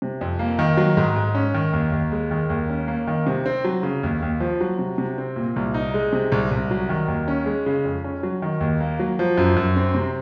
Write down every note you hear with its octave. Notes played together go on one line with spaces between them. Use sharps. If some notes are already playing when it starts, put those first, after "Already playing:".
C3
F2
A#3
D#3
F#3
G#2
G#2
C#4
D#3
D#2
D#2
G#3
D#3
D#2
C#4
A#3
D#3
C3
C4
F#3
C#3
D#2
D#2
F3
F#3
C3
C3
C4
A#2
C2
D#4
G#3
C3
C2
C2
F#3
D#3
D#2
C#4
G#3
C#3
F2
C#4
F#3
D#3
D#2
A#3
F#3
F3
F#2
F#2
C4
C3